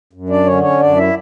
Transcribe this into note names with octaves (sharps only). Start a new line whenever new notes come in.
F#2
D4 D5
D3 C#4 C#5
C#4 C#5
F#2 D4 D5
E4 E5